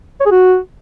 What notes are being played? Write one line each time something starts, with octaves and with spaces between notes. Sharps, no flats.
C#5
G#4
F#4